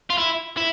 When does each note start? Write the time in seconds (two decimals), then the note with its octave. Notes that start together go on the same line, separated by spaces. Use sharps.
0.10 F4
0.18 E4
0.57 E4